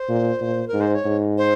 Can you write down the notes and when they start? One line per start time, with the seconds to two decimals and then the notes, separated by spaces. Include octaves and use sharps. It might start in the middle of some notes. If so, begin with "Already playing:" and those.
Already playing: C5
0.09 A#2
0.41 A#2
0.68 A#4
0.74 G#2
0.81 C5
0.95 C#5
1.05 G#2
1.38 C5